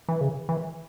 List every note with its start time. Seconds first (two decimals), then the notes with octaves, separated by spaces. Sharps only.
0.09 E3
0.21 C#3
0.49 E3